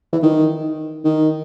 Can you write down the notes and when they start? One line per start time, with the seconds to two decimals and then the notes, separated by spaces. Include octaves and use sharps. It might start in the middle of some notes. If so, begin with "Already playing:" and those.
0.12 E3
0.23 D#3
1.04 D#3